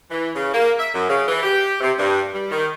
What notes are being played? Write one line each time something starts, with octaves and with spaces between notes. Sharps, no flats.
E3
C#3
A#3
E5
F#2
C#3
E3
G4
C3
G2
G3
D#3